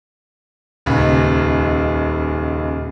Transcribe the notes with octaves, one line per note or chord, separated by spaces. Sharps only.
D#1 C#2